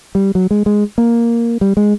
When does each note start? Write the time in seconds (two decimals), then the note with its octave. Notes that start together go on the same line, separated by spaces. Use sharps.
0.15 G3
0.35 F#3
0.51 G#3
0.66 G#3
0.98 A#3
1.61 G3
1.77 G#3